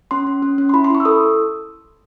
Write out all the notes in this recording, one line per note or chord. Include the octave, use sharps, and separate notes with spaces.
C#4 C6
C#4
C#4
C#4
C6
E4 B5
C6
E4 C#6
E6
A4 D#6